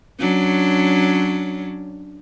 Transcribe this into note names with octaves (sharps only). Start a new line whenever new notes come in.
F#3 C#4 D4